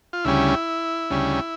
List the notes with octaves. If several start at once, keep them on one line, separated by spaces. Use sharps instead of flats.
F4
D2 C#3 G3 C#4 E4
D2 C#3 G3 C#4